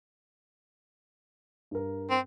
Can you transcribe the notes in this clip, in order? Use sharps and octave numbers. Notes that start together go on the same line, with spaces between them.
G2 A#4
C4